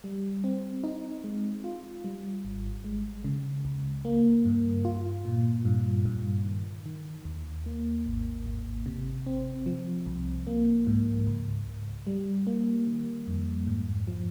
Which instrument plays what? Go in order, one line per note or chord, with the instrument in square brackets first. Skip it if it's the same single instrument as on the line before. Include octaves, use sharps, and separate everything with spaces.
[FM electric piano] G3
C4
D#4
G#3
F4
G3
G#1
G#3
C#3
C#2
A#3
G2
F4
A#2
G2
G2
D#3
D#3
D#2
A#3
G#1
G#1
C3
C4
F3
C2
A#3
G#2
C#2
C#2
G3
A#3
D#3
F2
G#2
F3